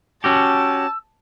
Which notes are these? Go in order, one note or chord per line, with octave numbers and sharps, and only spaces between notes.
C#4 F#4 G4 A5 E6